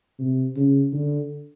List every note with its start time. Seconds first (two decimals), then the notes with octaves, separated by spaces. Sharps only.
0.19 C3
0.56 C#3
0.92 D3